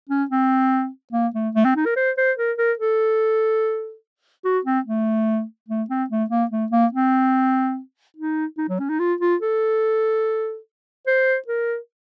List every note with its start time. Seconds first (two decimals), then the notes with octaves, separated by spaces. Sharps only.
0.09 C#4
0.31 C4
1.13 A#3
1.35 A3
1.55 A3
1.65 C4
1.76 D#4
1.85 A#4
1.96 C5
2.17 C5
2.38 A#4
2.58 A#4
2.79 A4
4.44 F#4
4.65 C4
4.85 A3
5.68 A3
5.90 C4
6.10 A3
6.30 A#3
6.51 A3
6.72 A#3
6.93 C4
8.17 D#4
8.58 D#4
8.69 F#3
8.79 C#4
8.89 D#4
8.99 F4
9.21 F4
9.42 A4
11.07 C5
11.48 A#4